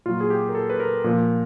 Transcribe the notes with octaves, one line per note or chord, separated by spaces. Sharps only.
A#2 F#3 F4
G#4
G4
A#4
A4
B4
A#4
A#2 F3